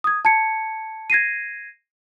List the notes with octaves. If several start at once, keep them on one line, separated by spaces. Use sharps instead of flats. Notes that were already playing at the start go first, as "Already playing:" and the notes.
D#6 G#6
A5 G#6 C#7
G#6 A#6 C7 D#7